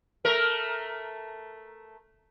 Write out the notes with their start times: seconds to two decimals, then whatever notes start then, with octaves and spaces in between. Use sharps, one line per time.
0.25 A3 A#4